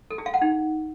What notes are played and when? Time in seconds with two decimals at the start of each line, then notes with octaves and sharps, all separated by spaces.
0.11 A4
0.18 G#4
0.26 F5
0.34 F#5
0.42 D#4